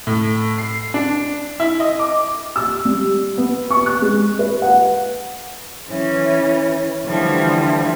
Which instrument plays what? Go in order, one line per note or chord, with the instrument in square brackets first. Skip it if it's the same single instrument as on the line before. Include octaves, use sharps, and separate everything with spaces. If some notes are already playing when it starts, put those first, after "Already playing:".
[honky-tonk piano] A2
C7
D4
E4
D#5
D6
[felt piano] E6
G3
B3
C#6
F#6
G#3
B4
F#5
[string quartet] E3 C#4
D3 E3 F3 G3 A3